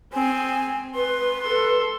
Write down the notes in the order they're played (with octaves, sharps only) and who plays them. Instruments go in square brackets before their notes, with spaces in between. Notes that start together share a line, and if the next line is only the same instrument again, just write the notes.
[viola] C4 [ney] G#5
[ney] B4 [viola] C6
[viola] A4 C6